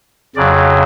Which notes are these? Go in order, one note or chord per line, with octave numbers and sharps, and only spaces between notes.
F2 C#3 F#3 D5